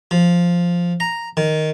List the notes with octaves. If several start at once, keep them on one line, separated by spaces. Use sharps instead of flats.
F3
A#5
D#3